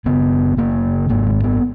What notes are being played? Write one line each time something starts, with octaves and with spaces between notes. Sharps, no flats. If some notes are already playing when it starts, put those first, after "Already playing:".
F#1 F#2 C#3 B3
F#1 F#2 C#3 A#3
G#1 G#2 A#3
G#3
B3